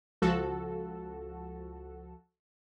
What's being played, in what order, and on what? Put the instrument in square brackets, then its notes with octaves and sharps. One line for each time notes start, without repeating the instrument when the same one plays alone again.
[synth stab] C#2 F3 F#4 A4